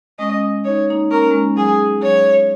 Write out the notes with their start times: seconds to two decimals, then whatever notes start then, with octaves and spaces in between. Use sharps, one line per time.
0.19 G#3 C#4 D#5
0.65 D#4 C#5
0.90 A#3 D#4
1.11 C#4 A#4
1.21 A#3
1.30 G#3 C#4
1.56 F#3 G#4
2.02 F#3 C#5